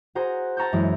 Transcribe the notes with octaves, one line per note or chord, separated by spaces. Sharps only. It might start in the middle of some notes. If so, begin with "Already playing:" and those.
F#4 G#4 C5 A#5
A5 A#5 C#6 E6 G6
F#2 E3 G#3